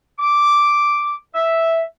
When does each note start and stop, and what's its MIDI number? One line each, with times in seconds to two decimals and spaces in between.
0.20 1.17 86
1.34 1.83 76